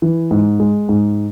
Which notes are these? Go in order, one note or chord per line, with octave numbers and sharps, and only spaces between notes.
E3
G#2
G#3
G#2